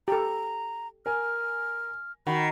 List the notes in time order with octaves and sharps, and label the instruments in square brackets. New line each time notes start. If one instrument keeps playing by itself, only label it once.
[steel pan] G4 A4 [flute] A#5
[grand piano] A#4 G#5 [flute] F6
[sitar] D#3 [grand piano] F#4 [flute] B5